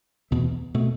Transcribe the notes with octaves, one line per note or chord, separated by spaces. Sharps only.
E2 B2 A3
B2 A3